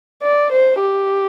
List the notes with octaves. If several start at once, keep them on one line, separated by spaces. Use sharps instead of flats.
D5
C5
G4